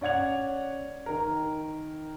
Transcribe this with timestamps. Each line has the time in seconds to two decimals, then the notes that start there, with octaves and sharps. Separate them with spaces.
0.01 C#4 D5 F#5 G#6 F7
1.06 D#3 A#4